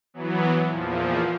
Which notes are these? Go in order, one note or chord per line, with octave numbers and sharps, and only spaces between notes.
E3 F#3 B3
E2 A#2 F3